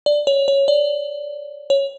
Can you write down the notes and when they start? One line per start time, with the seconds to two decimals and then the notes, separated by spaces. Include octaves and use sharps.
0.06 D5
0.27 C#5
0.48 C#5
0.68 D5
1.70 C#5